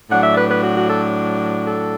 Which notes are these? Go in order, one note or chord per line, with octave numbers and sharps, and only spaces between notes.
A2 F#3 D4 F#5
E5
D5
B4
B4
F#4
F#4
A4
A4